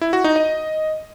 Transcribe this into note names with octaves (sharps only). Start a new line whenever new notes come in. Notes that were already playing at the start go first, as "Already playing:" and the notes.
E4
F#4
D#4
D#5